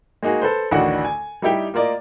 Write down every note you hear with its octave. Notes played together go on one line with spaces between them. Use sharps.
G#3 A#3 D#4 F#4 G#4
A4 B4 C5
A1 D2 D#3 D4 F#4 F#5
G#5
G3 D#4 E4 G4 G5
A#3 F4 A#4 D5 D#5